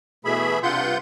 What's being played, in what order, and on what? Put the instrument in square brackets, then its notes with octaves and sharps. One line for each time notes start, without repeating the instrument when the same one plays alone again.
[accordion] B2 E3 A3 G#4 E5 B5
G2 C3 F4 F#5 C6 G6